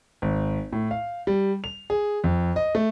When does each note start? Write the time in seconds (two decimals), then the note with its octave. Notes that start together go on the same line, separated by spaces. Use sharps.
0.22 G#1
0.72 A2
0.91 F5
1.27 G3
1.64 F7
1.90 G#4
2.24 F2
2.56 D#5
2.75 A3